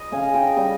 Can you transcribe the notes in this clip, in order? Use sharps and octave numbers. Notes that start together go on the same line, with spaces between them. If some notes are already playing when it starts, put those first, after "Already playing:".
Already playing: D#5
C#3 F5 G#5
D#5 G5
G3 D#5 G5